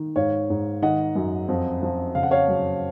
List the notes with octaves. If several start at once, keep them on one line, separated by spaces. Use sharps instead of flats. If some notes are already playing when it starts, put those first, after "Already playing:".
Already playing: D#3
G#2 C#5 F5
G#2
D#3 D#5 F#5
F#2
F2
F2
C#3 F5
F#5
C#5 F5
F#2